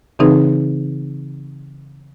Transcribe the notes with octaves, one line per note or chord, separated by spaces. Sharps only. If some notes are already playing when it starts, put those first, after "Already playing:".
C#3 E3 C4 D#4 G#4 B4